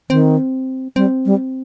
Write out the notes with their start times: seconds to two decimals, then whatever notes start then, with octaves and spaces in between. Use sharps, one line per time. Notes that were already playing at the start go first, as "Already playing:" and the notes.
0.10 D#3 C4
0.96 G3 C4
1.25 G3